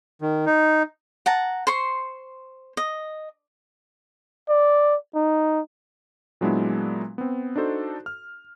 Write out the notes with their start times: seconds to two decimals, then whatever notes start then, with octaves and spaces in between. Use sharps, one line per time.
0.21 D#3
0.46 D#4
1.26 F#5 A5 A#5
1.67 C5 C6 C#6
2.77 D#5
4.49 D5
5.15 D#4
6.41 A#2 F#3 G#3 B3 D4 E4
7.18 B3 C4
7.56 D4 D#4 F#4 A4 C5
8.06 F6